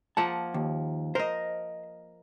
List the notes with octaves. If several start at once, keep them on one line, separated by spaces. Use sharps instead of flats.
F3 A#3 F#5 A5
D#2
A#4 C5 D#5